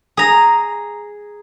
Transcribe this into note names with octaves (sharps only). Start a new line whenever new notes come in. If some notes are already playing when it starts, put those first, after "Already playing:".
G#4 A#5